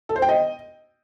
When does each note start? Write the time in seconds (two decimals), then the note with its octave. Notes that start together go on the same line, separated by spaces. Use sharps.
0.09 A4
0.16 C5
0.22 G5
0.29 D#5